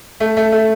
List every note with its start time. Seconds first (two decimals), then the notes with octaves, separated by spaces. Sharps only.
0.20 A3
0.37 A3
0.52 A3